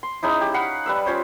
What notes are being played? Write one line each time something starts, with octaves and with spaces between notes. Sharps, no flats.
C6
G#3 C#4 D#4 E4
G4
F5 F#5 B5
G3 B4 E6
C#4 F4 C5 C#5